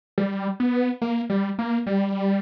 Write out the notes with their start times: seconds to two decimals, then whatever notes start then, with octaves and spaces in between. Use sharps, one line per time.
0.18 G3
0.60 B3
1.02 A#3
1.30 G3
1.59 A#3
1.87 G3